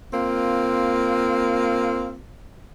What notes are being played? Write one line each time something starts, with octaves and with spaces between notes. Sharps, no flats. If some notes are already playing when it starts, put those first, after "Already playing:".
A#3 C4 F4